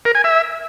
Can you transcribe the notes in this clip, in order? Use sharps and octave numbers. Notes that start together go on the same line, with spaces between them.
A#4
G#5
E5